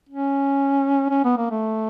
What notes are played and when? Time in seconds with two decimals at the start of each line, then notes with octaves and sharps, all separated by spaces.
0.09 C#4
1.10 C#4
1.24 B3
1.38 A#3
1.51 A3